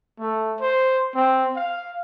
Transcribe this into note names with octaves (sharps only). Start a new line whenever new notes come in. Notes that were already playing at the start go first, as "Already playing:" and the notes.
A3
C5
C4
F5